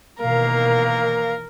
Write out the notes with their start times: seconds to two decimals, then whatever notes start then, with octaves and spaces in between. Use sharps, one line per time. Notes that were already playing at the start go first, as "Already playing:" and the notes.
0.21 B2 D#3 E3 A#3 A#4 F5